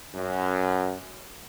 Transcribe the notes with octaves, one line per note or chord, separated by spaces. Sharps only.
F#2